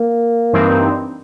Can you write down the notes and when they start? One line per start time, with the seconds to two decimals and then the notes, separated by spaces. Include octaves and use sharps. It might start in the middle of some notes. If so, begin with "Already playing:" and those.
Already playing: A#3
0.53 G2 E3 G3 C4 D#4